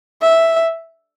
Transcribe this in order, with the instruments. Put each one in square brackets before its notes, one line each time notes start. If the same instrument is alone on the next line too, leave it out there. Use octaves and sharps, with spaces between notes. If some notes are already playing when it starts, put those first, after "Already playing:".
[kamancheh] E5